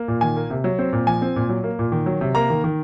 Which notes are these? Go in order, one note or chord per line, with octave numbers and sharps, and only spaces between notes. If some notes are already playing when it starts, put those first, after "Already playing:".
Already playing: A#3
A#2
D#3 G#5
A#3
C3
F#3
C4
A#2
F3 G#5
C4
A#2
F#3
A#3
A#2
D#3
F#3
C3
A#3 A#5
D#3
D#3